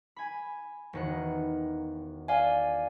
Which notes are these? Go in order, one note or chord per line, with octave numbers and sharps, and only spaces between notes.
G#5 B5
E1 D#3 F#5
D5 F5 G#5